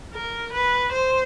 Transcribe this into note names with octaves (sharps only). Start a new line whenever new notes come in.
A#4
B4
C5